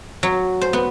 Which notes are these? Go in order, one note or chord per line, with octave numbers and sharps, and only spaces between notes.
F#3
C5
B3